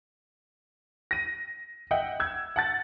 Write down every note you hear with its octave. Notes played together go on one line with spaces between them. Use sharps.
A#6 D#7
D#5 E5 F#5 G5
E6 G#6
F#5 A5 A6